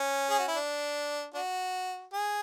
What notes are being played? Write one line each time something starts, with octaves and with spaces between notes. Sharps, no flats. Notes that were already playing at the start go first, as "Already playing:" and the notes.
Already playing: C#4
G#4
F#4
E4
D4
D4 F#4
G#4